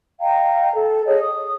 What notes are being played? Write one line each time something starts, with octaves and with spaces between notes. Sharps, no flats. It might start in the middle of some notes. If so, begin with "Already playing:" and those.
D#5 F5 G5 A#5
A4
G#4 C#5 D#5
D#6